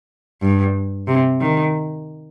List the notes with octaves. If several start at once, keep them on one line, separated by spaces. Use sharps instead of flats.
G2
C3
D#3